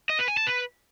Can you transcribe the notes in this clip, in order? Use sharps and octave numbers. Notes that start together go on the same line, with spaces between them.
D#5
B4
G#5
A5
B4